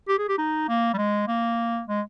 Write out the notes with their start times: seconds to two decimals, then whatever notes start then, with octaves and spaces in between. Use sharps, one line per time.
0.08 G4
0.18 G#4
0.28 G4
0.38 D#4
0.69 A#3
0.94 G3
0.98 G#3
1.28 A#3
1.88 G#3